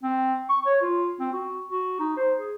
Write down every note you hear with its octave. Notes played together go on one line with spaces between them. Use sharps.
C4
C#6
C#5
F4
C4
F#4
F#4
D#4
C5
G#4